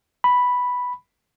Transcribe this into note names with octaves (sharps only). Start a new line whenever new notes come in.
B5